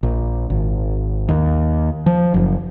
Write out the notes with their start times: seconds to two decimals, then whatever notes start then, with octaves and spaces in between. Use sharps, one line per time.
0.03 A#1
0.50 G#1
1.29 D#2
2.06 F3
2.34 F#1